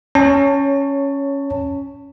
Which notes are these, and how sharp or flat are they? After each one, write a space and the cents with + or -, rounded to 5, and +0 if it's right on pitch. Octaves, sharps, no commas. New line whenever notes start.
C#4 +0 C#5 +10 A5 +20